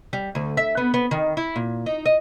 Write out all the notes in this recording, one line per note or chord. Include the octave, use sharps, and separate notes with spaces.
G3
D2
E5
B3
B3
D#3
E4
A#2
D#4
D#5